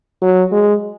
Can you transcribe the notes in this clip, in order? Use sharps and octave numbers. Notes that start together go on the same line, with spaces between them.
F#3
G#3